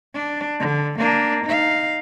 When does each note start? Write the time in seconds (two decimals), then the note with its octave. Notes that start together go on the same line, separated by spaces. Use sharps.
0.14 D4
0.60 D3
0.98 A#3 D4
1.44 D#4 F5